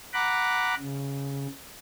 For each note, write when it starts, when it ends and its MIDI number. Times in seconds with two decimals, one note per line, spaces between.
0.14 0.75 78
0.14 0.75 82
0.14 0.75 83
0.14 0.75 86
0.14 0.75 90
0.79 1.47 49